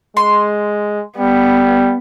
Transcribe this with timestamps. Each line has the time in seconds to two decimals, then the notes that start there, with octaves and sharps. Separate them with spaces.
0.17 G#3 C6
1.18 G3 B3